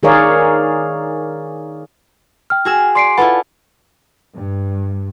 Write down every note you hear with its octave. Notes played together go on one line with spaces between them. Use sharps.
D#3 G#4 A#4 C#5 D5 F5
G5 F6
F#4 G#4 E6
D5 C6 C7 D7
E4 F4 A4 B4 F#5 B5
G2